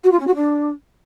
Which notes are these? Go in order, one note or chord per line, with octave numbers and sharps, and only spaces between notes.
F#4
F4
C#4
F#4
D4